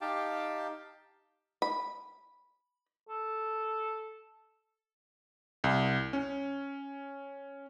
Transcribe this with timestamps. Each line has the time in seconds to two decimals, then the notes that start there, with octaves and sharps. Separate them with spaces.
0.01 D#4 G4 F5 G5 A5 D6
1.62 B5
3.09 A4
5.64 C2
6.13 C#4